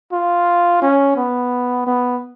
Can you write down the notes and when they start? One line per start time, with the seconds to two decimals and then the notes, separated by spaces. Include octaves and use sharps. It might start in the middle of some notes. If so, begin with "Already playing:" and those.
0.12 F4
0.82 C#4
1.17 B3
1.87 B3